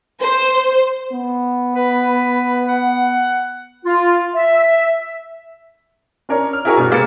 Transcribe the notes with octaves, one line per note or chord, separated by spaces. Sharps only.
C5
B3
B4
F#5
F4
E5
C#4 D4 A#4 C#5
F6
E4 F#4 G#4 A#4 G#5 C#6
G2 B2
C3 G#3 A#3 B4 A6 C#7